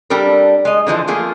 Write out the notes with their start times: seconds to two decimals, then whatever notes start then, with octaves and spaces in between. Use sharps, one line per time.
0.10 G3 D4 A4 A#4
0.65 G#3 D#5
0.87 D3 E3 F3 G#3
1.07 F3 A3 A#3 F4 G#4